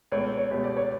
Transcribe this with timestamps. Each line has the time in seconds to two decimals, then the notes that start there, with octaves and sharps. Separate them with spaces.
0.12 C#2 B2 A3 C#5
0.37 C#5
0.51 C#2 B2 A3 G4
0.64 D5
0.77 C#5